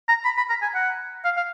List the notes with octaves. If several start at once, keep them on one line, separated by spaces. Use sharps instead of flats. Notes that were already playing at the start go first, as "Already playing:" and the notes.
A#5
B5
B5
A#5
G#5
F#5
F5
F5